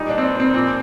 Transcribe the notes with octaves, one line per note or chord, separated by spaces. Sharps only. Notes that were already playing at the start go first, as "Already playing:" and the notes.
Already playing: A#2 G3 D#4
D4
C4
D4
C4
A#2 F3 C4